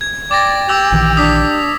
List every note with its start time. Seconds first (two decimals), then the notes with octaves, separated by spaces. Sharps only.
0.01 G#6
0.31 D5 G5 D6 A6 A#6
0.69 G4 D6 E6 F7
0.92 A#1 D#3 E3
1.17 D4 D#6 B6